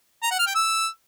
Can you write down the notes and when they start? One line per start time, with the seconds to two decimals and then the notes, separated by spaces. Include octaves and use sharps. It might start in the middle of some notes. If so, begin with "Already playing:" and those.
0.23 A#5
0.31 F#5
0.39 F6
0.47 G5
0.55 E6